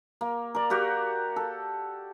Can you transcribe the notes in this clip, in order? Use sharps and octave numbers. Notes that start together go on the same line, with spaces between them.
A#3
A#4 D5
F#4 G4 A#4
A4